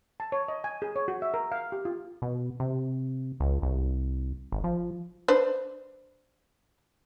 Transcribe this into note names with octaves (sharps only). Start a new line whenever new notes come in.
A5
C#5
D#5
G#5
G#4
C#5
F#4
E5
A#4
F5
G4
F4
B2
C3
C#2
C2
G#1
F3
D4 B4 C5